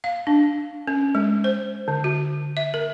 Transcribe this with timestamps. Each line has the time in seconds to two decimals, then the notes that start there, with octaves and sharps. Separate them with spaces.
0.04 F5
0.27 D4
0.87 C#4
1.15 G#3
1.44 C5
1.88 D3
2.04 F#4
2.57 E5
2.74 A#4